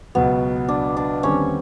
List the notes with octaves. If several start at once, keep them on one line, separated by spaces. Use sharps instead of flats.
C#2 B2 F#3 B3
D4
D4
D#2 D3 G3 C4 C#4